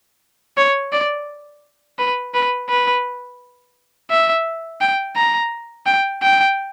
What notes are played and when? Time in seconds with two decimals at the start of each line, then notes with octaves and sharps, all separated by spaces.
0.57 C#5
0.92 D5
1.99 B4
2.34 B4
2.69 B4
4.11 E5
4.81 G5
5.16 A#5
5.86 G5
6.22 G5